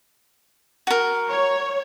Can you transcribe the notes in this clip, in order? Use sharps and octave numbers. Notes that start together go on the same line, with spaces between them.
F#4 A#4
C#5